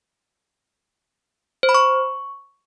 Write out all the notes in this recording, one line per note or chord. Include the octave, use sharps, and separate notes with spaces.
C5
B5
C#6